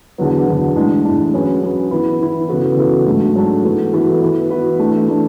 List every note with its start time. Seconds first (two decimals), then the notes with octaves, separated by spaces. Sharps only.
0.18 E2 D3 F#3 B3
0.47 E2 D3 F#3 B3
0.76 A2 E3 G#3 D4
1.05 A2 E3 G#3 D4
1.34 F#3 C#4 G#4 B4
1.62 F#3 C#4 G#4 B4
1.91 E3 B3 E4
2.20 E3 B3 E4
2.49 C#3 E3 B3 F#4 A4
2.77 C#3 E3 B3 F#4 A4
3.07 G#2 F#3 A3 D4
3.35 G#2 F#3 A3 D4
3.64 E3 B3 F#4 A4
3.93 E3 B3 F#4 A4
4.22 E3 B3 F#4 B4
4.50 E3 B3 F#4 B4
4.79 E3 A3 D4
5.08 E3 A3 D4